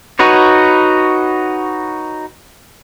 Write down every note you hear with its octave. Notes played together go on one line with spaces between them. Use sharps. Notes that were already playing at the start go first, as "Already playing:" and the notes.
D#4 F#4 B4 C#5